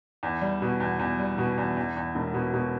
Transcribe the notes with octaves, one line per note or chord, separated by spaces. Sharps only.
E2
G3
B2
E2
E2
G3
B2
E2
E2
E2
E1
B2
B2